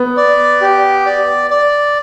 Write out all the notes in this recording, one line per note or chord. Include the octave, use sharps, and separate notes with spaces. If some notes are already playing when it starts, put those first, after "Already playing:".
Already playing: B3
D5
G4
D5
D5